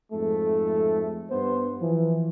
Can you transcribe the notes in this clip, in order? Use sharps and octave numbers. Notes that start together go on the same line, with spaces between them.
F2 G#2 A3
G2 B3 C5
E3 F3